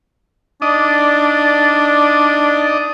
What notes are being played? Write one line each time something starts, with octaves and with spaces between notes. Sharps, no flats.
D4 D#4 D5 D#5